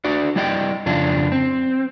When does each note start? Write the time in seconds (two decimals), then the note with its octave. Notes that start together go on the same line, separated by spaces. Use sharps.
0.04 D4 F#4 D5
0.36 G3 E4 D5 D#5 G5
0.86 F2 C#3 D4 F4
1.32 C4